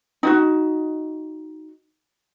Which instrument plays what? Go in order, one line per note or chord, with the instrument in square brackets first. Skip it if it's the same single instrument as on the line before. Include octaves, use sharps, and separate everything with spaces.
[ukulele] D#4 F4 F#4